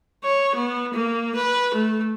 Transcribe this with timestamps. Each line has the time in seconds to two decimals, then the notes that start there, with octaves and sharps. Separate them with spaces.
0.24 C#5
0.55 B3
0.93 A#3
1.35 B4
1.74 A3